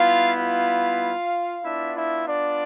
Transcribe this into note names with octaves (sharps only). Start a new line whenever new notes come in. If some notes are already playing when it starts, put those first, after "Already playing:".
Already playing: G3 B3 E4 F4 F5
F4 F5
B3 D4 E4 F4 E5
E4 E5
D4 D5